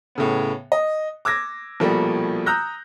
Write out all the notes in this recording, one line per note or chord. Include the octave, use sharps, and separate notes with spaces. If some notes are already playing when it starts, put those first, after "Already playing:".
A2 C#3 B3
D#5
D6 E6 G#6 A#6
A#1 B2 F3 G3 A3 A#3
A#5 D#6 E6 F#6 G6 A#6